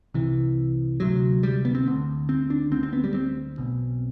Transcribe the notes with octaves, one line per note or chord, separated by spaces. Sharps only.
C2 C3 E3
D2 C3 F#3
G3
B3
C4
D2 D3
C4
D4
D2 D3 C4
C4
B3
G3
C4
B1 B2